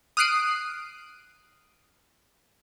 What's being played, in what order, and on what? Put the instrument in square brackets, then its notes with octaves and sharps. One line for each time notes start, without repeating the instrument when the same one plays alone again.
[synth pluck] D#6 F6 F#6 C7 D7 D#7